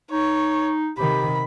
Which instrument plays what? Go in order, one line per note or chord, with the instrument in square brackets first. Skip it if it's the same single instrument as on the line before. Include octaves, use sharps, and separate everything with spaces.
[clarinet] D#4 [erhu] C#5
[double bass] C3 D#3 [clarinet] G4 [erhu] B5